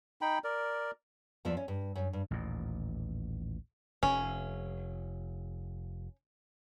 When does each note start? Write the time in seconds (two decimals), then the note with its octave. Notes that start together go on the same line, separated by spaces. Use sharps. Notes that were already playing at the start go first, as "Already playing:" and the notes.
0.21 D#4 G5 B5
0.44 A#4 D5
1.45 E2 F3 D5 E5
1.57 C#4
1.68 G2
1.96 F#2
2.13 G2
2.31 A1 D#2 A#2
4.03 F1 C#4